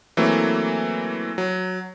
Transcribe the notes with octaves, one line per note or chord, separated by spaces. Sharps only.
E3 F#3 A3 A#3 C4
F#3